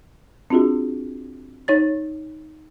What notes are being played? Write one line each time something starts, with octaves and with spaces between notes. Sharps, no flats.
C4 D4 F4 F#4 G#4
D#4 C#5 A6